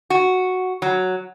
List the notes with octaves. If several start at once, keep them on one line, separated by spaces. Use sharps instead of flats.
F#4
F#3